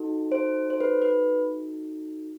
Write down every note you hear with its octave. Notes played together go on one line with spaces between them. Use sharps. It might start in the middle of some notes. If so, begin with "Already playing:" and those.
Already playing: D#4 F#4 A4
C5
C5
B4
B4